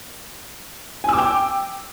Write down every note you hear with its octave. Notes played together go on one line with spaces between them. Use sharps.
G5 G#5 D6 E6